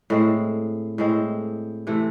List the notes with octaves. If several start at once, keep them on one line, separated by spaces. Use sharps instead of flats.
A2 G#3 C4
A2 G#3 C4
C3 E3 A3